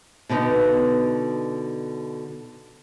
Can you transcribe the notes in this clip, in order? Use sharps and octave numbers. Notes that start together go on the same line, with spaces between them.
B2 D3 B3 D#4